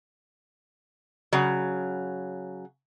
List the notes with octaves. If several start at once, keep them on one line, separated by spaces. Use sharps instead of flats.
C#3 F#3